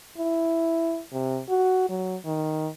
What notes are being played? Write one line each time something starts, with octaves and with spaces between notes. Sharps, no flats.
E4
C3
F#4
F#3
D#3